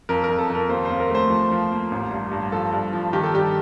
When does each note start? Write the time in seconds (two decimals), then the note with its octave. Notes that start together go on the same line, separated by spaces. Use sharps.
0.09 F2 A#4
0.24 A#4
0.29 F2
0.38 A4
0.50 F2 A#4
0.69 D#2 C5
0.85 D#2 C5
1.00 A#4
1.10 A3 C5
1.30 F3
1.51 F3
1.71 A#3
1.91 A1
2.11 G2
2.32 G2
2.52 F3 A4
2.73 G2
2.93 F3
3.13 D#3 G4
3.23 A4
3.34 G2 G4